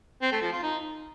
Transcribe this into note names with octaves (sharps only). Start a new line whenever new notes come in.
C4
A3
F3
F4
D#4